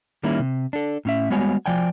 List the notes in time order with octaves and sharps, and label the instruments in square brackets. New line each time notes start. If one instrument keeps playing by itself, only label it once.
[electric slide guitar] D#3 G3 A#3 C#4 E4
C3
D4 A4
A2 C#4 E5
G3 G#3 B3 F#4 C#5 G#5
F3 D5 G5 G#5